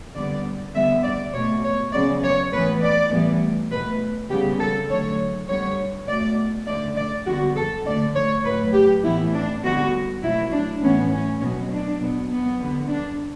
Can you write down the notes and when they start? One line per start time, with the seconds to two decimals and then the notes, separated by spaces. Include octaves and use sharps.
0.15 D3 G3 B3 D5
0.75 D3 G3 B3 E5
1.04 D5
1.34 B2 A3 C#5
1.64 C#5
1.93 C#3 F#3 B3 D5
2.23 C#5
2.52 A2 E3 B3 B4
2.82 D5
3.11 A2 E3 G3 B3
3.71 B2 A3 B4
4.30 C#3 G3 B3 G4
4.60 A4
4.90 D3 F#3 A3 C#5
5.48 D3 G3 B3 C#5
6.08 B2 A3 D5
6.67 D3 A3 D5
6.97 D5
7.26 D3 G3 B3 F#4
7.56 A4
7.85 D3 A3 D5
8.16 C#5
8.45 A2 F#3 A3 B4
8.74 G4
9.04 A2 E3 B3 E4
9.34 D4
9.63 D3 G3 B3 F#4
10.22 B2 F#3 A3 E4
10.52 D4
10.82 A2 E3 B3 C#4
11.11 C#4
11.40 B2 F#3 B3 C#4
11.71 D4
12.00 B2 F#3 B3
12.30 B3
12.60 D3 G3 B3
12.89 D4